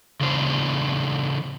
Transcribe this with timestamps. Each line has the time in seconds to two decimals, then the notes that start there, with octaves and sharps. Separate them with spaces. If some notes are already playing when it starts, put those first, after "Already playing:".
0.21 C#3 E3 D4 C5